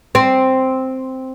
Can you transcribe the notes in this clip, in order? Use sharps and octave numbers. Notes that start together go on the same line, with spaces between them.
C4